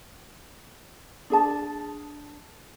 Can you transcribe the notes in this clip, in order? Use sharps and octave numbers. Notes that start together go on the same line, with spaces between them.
D4 G#4 A5